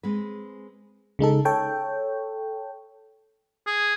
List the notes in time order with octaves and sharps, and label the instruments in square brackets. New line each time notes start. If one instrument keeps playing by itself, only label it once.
[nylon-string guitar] G#3 C4 B4
[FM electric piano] C#3 G#3 D#4 A4
A4 C#5 G5
[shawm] G#4